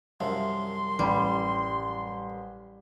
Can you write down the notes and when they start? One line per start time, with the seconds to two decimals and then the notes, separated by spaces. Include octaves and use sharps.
0.20 C2 F#2 F3 E5 C6
0.99 A1 G3 B5